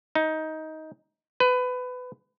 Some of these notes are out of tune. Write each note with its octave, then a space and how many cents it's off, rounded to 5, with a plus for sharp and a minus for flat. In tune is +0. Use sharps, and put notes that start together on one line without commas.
D#4 +15
B4 +20